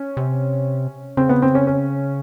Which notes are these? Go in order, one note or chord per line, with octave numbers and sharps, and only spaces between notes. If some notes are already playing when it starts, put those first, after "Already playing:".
Already playing: C#4
C3
C#3 C4
B3
C4
C#4
C#4